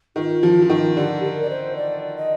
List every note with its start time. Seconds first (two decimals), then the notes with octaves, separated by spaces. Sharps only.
0.16 D#3 F4
0.43 F3
0.62 F3
0.70 D#3
0.97 D3 G4
1.24 A#4
1.43 D5
1.50 C5
1.77 D5
2.17 D#5